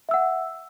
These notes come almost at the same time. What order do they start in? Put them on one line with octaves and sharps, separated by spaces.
E5 E6 F#5